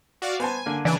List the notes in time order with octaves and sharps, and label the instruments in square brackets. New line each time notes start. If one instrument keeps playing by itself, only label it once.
[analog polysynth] F#4 D5 F5
[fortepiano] B3 C5 A5 [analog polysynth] G#5
[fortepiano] D3 A#3
[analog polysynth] C#3 D4 G#5 [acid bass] E3 [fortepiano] D5